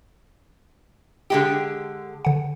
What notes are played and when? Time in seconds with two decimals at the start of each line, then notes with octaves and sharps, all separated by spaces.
1.30 D3 G#3 G4
2.25 D3 F#5